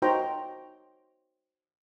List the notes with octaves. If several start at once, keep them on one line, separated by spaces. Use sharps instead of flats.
D#4 F#4 C5 C#5 G5 A#5